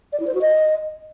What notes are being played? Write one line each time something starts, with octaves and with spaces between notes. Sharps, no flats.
D5
E4
C5
F#4
D#5